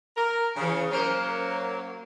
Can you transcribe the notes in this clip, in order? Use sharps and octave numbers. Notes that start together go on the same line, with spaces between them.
A#4
C#3 E3 C#4
F#3 A#3 C#4 A#4 C5